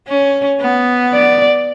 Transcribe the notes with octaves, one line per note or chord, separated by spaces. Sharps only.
C#4
B3
D5